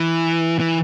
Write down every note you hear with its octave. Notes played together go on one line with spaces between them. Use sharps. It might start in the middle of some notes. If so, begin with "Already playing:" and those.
Already playing: E3
E3